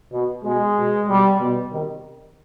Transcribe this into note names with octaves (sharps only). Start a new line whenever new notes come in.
B2
B2 G#3
B2
B2 G3
B2
C3 D#3